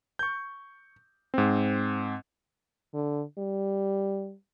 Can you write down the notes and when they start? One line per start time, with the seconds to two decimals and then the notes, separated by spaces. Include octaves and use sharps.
0.19 C#6 G6
1.34 G#2 C4
2.94 D3
3.38 G3